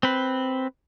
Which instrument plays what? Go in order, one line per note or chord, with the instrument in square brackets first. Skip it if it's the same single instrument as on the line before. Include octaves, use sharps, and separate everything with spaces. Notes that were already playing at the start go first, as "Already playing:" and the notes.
[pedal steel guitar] C4 B4